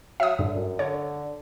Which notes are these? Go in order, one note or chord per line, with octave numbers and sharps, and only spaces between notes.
F#3 E5 D#6
G2 D3
F#2
D3 C#5